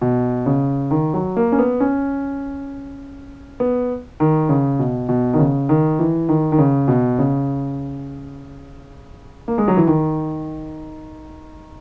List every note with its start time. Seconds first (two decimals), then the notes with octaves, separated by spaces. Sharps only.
0.01 B2
0.46 C#3
0.91 D#3
1.14 F#3
1.37 A#3
1.52 C#4
1.59 B3
1.80 C#4
3.60 B3
4.20 D#3
4.49 C#3
4.79 B2
5.09 B2
5.33 D#3
5.38 C#3
5.69 D#3
5.99 E3
6.29 D#3
6.52 D#3
6.58 C#3
6.88 B2
7.18 C#3
9.48 A#3
9.58 G#3
9.68 F#3
9.77 E3
9.87 D#3